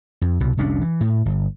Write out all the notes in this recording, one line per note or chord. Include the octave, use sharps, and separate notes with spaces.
F2
C2 B2
F1 C2 C#4 D4
E3
A2
G1